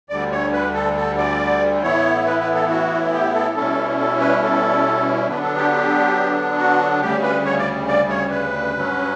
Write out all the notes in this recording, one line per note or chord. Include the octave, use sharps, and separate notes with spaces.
D2 D3 G3 D5
C#5
B4
A4
A4
D5
A2 E3 B3 E4 C#5
B4
B4
A4
F#4
G4
A4
B2 G3 C#4 E4 A4
A4
B4
A4
D3 F#3 B3 D4 B4
A4
G4
G4
F#4
D2 C#3 G3 G4
B4
C#5
D5
D5
C#5
B4
G2 F#3 C#4